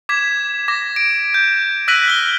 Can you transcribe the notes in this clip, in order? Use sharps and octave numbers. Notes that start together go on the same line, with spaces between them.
D6 G#6 B6 E7
D6 A#6
D7
G6
E6 F#6 A#6 B6 D#7 F#7
E6 F6 G7